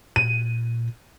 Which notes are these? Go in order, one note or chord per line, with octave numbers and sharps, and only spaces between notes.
A#2 D#7